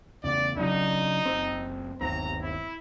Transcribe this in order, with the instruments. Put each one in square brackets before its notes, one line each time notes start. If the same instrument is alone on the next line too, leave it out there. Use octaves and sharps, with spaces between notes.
[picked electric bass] E2 C#3 [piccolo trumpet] D5
[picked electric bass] C#3 F#3 D4 [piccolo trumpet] D#4
[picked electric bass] F#1 C4
[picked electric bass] G1 D#2 C4 [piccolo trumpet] A#5
[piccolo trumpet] E4